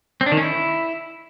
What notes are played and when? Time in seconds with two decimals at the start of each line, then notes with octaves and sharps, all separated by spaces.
0.21 C4
0.26 D4
0.32 D#3
0.37 C#4
0.43 E4